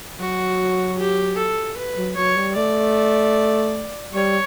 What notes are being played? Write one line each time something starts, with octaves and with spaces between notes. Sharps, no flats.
F#3 F#4
G4
A4
B4
F#3
F#3 C#5
G3
A3 D5
G3 C#5